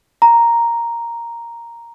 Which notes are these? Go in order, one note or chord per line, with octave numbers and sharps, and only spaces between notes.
A#5